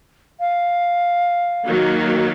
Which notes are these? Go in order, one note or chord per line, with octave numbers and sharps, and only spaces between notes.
F5
D#3 F#3 A#3